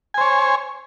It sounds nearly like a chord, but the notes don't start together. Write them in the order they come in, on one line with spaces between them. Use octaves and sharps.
G#5 C5 C#5